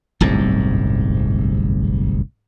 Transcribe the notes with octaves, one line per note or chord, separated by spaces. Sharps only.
D1 G1 C2 G#2